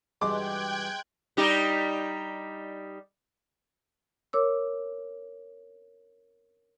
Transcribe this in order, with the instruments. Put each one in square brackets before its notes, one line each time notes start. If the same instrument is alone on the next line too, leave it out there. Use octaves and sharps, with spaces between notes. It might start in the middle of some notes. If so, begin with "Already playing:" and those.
[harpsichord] G2 B2 E3 [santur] G#3 [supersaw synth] G5 F#6 G#6 [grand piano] D6
[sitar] G3 D#4 G4
[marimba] A#4 C#5 D6 E6